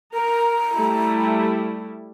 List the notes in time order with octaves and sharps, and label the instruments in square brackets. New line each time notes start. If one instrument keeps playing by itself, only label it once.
[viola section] A#4 [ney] A#5
[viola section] G3 A3 E4